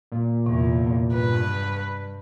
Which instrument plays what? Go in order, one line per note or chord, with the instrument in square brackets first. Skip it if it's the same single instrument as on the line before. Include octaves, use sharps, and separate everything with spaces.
[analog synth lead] A#2
[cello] E2 [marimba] C3
[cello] G2 [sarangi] B4